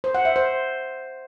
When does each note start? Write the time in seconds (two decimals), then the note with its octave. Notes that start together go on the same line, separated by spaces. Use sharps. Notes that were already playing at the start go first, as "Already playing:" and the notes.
0.04 C5
0.15 F#5
0.25 E5
0.36 C5